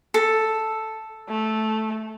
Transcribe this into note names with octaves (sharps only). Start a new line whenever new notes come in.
A4
A3